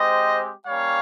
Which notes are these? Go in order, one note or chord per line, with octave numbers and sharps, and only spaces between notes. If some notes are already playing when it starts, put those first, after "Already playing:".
Already playing: G#3 C4 G4 C5 D#5
G3 A#3 C#4 C#5 F5